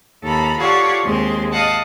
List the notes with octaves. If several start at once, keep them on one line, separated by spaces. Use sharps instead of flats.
D#2 A4 A#5 B5
F4 G4 A4 C#5 D5 F#5
D#2 G#3 C4 C6
D#5 F5 F#5 A5